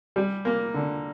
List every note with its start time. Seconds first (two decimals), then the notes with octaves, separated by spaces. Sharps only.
0.16 G3
0.45 A#3
0.74 D3